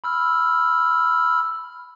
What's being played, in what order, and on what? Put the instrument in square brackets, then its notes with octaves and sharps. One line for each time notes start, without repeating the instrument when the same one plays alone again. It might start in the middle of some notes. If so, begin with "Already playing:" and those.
[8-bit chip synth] B5 E6 F6